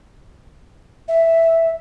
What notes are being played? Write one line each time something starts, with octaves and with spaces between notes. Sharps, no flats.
E5